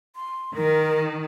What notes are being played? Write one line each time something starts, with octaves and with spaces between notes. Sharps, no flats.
C6
D#3 A#4